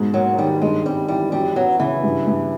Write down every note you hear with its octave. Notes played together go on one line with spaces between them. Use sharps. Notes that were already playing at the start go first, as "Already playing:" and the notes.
Already playing: G#2 B2
F#3 A#3
D#3 G3
G2 G#3
G3 C4
E3 G3
F#2 G3
F#3 B3
C#3 E3
G2
G2